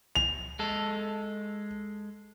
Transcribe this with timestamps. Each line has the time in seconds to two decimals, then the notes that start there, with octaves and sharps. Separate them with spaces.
0.15 F7
0.59 G#3 A4